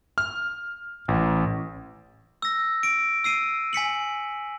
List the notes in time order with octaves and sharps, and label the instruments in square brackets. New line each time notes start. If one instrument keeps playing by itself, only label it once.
[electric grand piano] F6
A1
[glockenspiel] E6 A#6
D7
E6 C7 D#7
G#5 B6 C#7 F#7